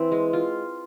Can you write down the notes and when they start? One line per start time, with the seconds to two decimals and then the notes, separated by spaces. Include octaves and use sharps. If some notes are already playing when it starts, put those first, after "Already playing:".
Already playing: E3 C4
0.11 G#3
0.33 F4